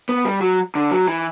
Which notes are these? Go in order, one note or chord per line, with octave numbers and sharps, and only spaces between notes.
B3
G3
F#3
D3
F#3
E3